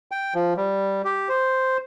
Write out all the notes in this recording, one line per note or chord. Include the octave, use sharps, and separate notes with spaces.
G5
F3
G3
G4
C5